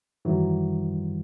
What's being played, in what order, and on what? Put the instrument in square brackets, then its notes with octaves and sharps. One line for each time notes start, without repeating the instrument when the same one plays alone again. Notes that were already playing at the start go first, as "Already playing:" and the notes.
[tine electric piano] F#2 D#3 G3 [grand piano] E3 F#3